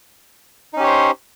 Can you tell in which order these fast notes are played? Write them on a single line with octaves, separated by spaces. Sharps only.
D#4 C#4 G4 C#5 C5